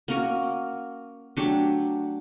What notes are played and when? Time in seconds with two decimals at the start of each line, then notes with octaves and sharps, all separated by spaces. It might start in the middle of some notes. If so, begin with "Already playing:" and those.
0.08 A#3 C#4 F#4 A#4
1.37 F#3 A3 D4 G4